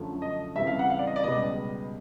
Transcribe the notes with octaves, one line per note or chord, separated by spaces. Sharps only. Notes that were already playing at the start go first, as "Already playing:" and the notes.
Already playing: F#2 D3 F3 A3
D#5
F2 C#3 E3 G3 E5
F5
F#5
F5
D5
D#5
D5
C#2 B2 G3 B3 D#5